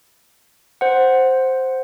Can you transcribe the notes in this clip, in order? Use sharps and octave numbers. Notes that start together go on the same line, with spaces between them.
C5 F#5